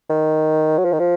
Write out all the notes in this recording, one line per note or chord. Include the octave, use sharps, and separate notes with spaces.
D#3
F#3
F3
D#3
F3